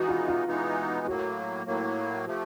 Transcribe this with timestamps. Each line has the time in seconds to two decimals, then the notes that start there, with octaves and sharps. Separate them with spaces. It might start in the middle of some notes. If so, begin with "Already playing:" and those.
Already playing: E3 G#3 B3 D#4 F#4
0.09 F4
0.28 F4
0.48 E3 G#3 B3 D#4
1.06 A2 F#3 A#3 F#4
1.66 A2 F#3 A#3
2.25 C3 F3 A3